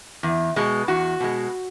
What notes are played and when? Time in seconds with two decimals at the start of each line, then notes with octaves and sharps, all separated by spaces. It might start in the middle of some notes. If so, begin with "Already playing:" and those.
0.23 E2
0.56 B2 G#3
0.88 E2 F#4
1.20 B2 G#3